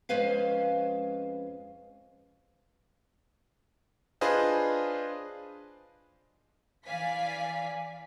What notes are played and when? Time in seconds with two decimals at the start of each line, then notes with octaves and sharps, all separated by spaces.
0.09 F2 G#3 C#4 B4 C5 F5
4.21 D4 F4 G#4 B4 C5 D#5
6.85 E3 D5 F5 G#5 B6